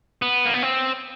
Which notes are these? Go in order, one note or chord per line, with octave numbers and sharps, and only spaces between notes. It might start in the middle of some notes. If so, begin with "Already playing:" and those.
B3
A#3
B3
C4